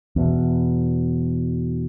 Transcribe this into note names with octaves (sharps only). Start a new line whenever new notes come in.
E2 B2